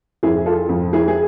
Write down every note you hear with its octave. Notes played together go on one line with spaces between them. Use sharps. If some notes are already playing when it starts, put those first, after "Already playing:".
F2 E4 G#4
F4 A4
F2
E4 G#4
G#4